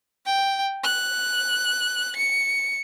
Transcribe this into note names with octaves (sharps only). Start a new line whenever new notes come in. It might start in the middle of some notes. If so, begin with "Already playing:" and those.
G5
F#6
C#7